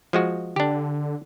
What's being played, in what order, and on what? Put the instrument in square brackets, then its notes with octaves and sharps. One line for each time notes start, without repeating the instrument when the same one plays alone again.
[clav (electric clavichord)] F3 G#3 F#4
[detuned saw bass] D3 [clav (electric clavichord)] D4 G4